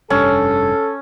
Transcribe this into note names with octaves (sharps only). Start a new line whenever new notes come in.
F1 G2 C#4 A4